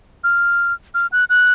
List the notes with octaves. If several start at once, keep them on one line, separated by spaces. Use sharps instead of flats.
F6
F6
F#6
F#6